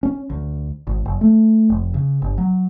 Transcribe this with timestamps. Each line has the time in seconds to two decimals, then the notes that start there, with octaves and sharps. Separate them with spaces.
0.03 C#4
0.30 D2
0.87 G#1
1.05 F#1
1.21 A3
1.69 F1
1.94 C#3
2.22 G1
2.38 F#3